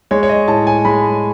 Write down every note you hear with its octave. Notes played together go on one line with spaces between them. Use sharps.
G#3 C#5
C#5
D#5
A2 A5
G#5
G#3 B5